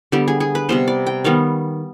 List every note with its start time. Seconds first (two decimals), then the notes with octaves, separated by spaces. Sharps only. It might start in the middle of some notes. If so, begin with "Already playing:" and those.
0.12 D3 G3 B3 G4
0.28 G#4
0.40 G#4
0.55 B4
0.69 C3 G3 B3 C5
0.88 D5
1.07 G5
1.24 D#3 G3 B3 F5